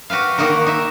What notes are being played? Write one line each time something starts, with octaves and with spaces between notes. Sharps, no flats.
F#4 G4 B4 F5
D#3 A#3 D#4 F#4 A#4
D#4 E5